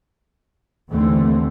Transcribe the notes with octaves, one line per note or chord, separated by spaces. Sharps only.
D#2 D3 E3 A3 C4